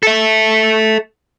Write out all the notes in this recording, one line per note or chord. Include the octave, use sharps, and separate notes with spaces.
A4 E5